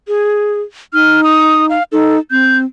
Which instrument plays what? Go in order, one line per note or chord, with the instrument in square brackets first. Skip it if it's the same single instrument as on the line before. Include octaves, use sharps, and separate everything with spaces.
[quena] G#4
[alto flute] D#4 [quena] F6
[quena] D#6
F5
[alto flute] D#4 [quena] A4
[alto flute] C4 [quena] G6